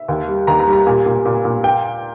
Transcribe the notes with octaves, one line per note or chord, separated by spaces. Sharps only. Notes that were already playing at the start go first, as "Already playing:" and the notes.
Already playing: E5
D#2
G3
D#2 A#5
A#5
G3
A#5
A#2 G#5
A#2
A#2
A#2
G5